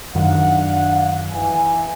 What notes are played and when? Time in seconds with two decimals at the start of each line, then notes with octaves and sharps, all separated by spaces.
0.15 F#2 D#3 D4 F5 F#5
1.31 E3 G#5